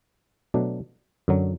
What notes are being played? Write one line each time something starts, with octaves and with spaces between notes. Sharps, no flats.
B2 F#3 A3 D4
F#2 D3 F#3